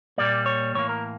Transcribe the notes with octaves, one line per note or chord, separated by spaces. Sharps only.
A#2 G3 A#3 D5
C#5
A2 E3 A#3 C#5
A#4